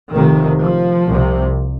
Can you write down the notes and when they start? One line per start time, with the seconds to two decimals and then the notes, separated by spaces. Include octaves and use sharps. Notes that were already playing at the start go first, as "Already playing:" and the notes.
0.12 F1 F2 C3 D#3
0.61 F3
1.08 C2 C3